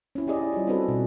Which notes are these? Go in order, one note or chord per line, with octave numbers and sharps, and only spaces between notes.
C#4 E4
C#4 G4 G#4 D5 D#5
G3 F4
C4 D4 F#4 G#4 A4 B4
B2